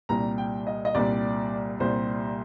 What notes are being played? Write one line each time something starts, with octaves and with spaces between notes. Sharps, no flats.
C2 A#2 G3 A#5
G5
D#5
D#5
C2 A#2 G3 D5
C2 A#2 G3 C5